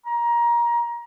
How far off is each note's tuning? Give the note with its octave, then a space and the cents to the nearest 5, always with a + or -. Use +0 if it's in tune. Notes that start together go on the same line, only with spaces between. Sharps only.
A#5 +20